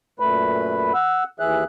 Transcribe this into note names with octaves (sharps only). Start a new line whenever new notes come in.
F#2 A#2 A3 B4 B5
F#5 E6
D#2 E3 G#4 E5 F#6